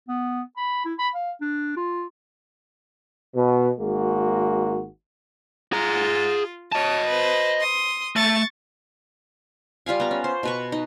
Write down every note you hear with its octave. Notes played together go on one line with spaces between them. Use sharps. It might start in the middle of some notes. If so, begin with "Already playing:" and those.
B3
B5
E4
B5
F5
D4
F4
B2
G#1 G#3 A#3 F#4
F4 G#4 A#5
C#5 D#5 A5 D#6
B4 C5
C6 D#6
A3 C#6 A6
G3 F4 F5 G#5
B3 A#5
C#4
C5
B2 B4 C#6
D#4